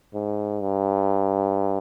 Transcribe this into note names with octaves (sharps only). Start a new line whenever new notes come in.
G#2
G2